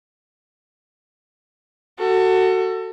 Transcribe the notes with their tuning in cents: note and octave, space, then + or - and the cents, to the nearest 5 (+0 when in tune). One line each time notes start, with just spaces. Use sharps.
F#4 +10 A4 +25